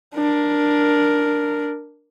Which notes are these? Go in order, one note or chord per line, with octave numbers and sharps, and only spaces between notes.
D4 A#4